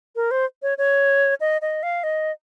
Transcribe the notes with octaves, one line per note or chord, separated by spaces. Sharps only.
A#4
C5
C#5
C#5
D#5
D#5
F5
D#5